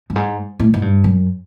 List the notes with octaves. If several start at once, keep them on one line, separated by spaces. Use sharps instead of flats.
G2
G#2
A2
G#2
G2
F#2